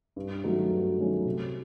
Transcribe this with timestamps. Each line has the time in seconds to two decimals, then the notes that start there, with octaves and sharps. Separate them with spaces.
0.16 G2
0.44 D#3 F#3 A3 C#4
0.71 G2
0.98 D#3 F#3 A3 C#4
1.25 C3